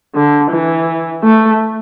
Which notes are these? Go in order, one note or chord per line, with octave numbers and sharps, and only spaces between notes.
D3
E3
A3